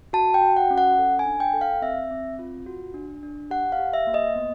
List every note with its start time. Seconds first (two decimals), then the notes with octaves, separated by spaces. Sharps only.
0.13 F#4 A5
0.34 G5
0.41 F#4
0.57 F#5
0.71 C#4
0.78 F#5
0.99 A4
1.19 G#5
1.26 D4
1.40 G5
1.54 A4
1.61 F5
1.82 C4 E5
2.11 C4
2.39 F4
2.66 F#4
2.94 D4
3.23 D4
3.50 G4 F#5
3.72 F5
3.79 G4
3.93 E5
4.07 A#3
4.14 D#5
4.36 B3